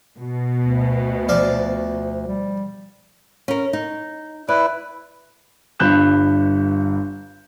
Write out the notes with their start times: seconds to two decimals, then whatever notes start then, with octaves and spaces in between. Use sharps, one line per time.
0.18 B2
0.59 D2
1.29 F3 D5 F5
2.27 G3
3.48 C#4 A#4
3.73 D#4
4.48 E4 B4 D5
5.79 G1 G2 B5 F#6 G6 E7